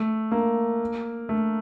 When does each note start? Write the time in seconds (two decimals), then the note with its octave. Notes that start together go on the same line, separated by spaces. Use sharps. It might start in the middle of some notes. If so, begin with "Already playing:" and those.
Already playing: A3
0.32 A#3
1.29 A3